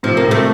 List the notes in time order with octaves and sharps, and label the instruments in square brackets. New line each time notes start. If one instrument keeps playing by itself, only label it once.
[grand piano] A2 C3 [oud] F3
[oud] A#3
[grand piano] A2 C3
[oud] A3